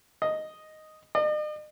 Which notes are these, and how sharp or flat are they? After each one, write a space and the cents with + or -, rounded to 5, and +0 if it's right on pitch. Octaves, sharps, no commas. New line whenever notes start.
D#5 +0
D#5 -45